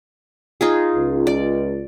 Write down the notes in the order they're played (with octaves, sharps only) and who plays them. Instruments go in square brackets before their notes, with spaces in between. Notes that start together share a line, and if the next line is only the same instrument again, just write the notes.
[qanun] D#4 F4 G#4
[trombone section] C#2
[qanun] D5